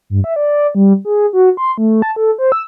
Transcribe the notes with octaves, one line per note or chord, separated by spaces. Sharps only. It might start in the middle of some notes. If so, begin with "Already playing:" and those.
G2
E5
D5
G3
G#4
F#4
C6
A3
A5
A4
C5
E6